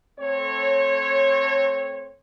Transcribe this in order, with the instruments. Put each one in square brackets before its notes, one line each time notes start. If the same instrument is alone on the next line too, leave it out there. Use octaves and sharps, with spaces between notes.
[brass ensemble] A3 C4 C#5